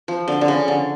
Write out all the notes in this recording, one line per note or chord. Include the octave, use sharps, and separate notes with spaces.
F3
D3
D3
C#3
D3